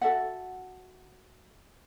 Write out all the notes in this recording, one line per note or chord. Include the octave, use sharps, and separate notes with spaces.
F#4 A4 E5 F#5